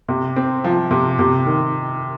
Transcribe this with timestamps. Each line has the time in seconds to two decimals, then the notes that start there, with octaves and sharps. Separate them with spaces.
0.09 C3
0.36 C4
0.64 F3
0.91 C3
1.19 C3
1.46 D#3